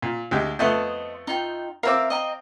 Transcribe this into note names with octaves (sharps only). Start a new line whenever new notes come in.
A#2
D2 G#3 G4
F2 A3 B3 C5 D#5 A5
D#4 F4 G5
C4 A#4 E5 F5 D6
D#5 G5 A#5